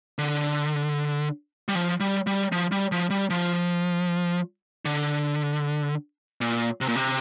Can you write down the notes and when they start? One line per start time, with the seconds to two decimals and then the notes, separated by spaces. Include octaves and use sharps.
0.18 D3
1.68 G3
1.75 F3
2.00 G3
2.27 G3
2.52 F3
2.72 G3
2.92 F3
3.10 G3
3.30 F3
4.85 D3
6.41 A#2
6.81 C3
6.88 A#2
6.96 C3